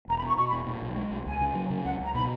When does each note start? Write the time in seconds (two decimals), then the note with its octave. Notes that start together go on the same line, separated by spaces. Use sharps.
0.08 E1 A#5
0.17 B5
0.23 B2 C#6
0.37 B2 C#6
0.48 B5
0.53 E1
0.67 A#2
0.82 B1
0.96 G#3
1.11 B1
1.26 C#2 G#5
1.41 C#3
1.55 F#3
1.70 C#3
1.85 C#2 F#5
2.00 C#2 A#5
2.15 B2 B5